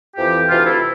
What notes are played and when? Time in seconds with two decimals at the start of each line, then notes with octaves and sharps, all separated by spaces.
0.17 F2 E3 G4
0.49 D2 C3 E3 F4
0.66 E4